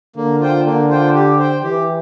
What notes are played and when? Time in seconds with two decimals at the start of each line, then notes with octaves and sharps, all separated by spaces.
0.16 D3 A#3
0.40 F4 C5 G5
0.65 D3 A#3
0.90 F4 C5 G5
1.15 G4
1.39 C5 G5
1.63 E3 G4